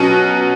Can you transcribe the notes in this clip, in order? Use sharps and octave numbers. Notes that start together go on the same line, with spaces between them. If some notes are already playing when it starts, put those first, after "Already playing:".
Already playing: B2 F#3 C#4 F#4